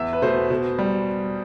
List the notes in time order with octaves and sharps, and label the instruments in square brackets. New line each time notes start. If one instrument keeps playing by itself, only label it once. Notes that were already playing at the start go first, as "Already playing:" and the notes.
Already playing: [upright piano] E2 E5
B4
B2 A3 C5
B2
G3